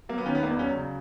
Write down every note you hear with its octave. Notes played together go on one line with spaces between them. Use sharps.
F#3 A#3
B3
D#3 C#4
B3
E1 A#3
B3
F#3 C#4
C#3